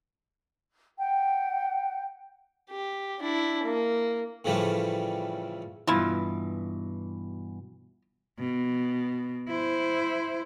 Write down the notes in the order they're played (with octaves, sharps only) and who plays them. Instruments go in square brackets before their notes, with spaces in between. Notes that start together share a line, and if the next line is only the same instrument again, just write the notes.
[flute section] F#5 G5
[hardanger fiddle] G4
D4 E4
A#3
[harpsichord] A2 C#3 E3 F3 G3 A3
[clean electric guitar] G2 B2 E3 [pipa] E4 F4
[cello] B2
E4 C5